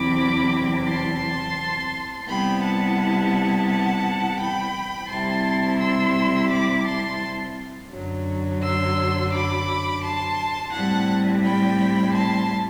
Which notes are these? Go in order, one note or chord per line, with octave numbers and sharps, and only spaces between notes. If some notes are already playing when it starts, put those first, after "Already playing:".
Already playing: E2 C3 F#3 C4 E4 B5 D6
A5 C6
C3 G3 B3 E4 G5 B5
F#5 A5
F#5 A5
G5 B5
C3 G3 C4 E4 A5 C6
C6 E6
B5 D6
A5 C6
F#2 D3 F#3
C6 E6
B5 D6
A5 C6
A2 G3 C4 E4 F#5 A5
G5 B5
A5 C6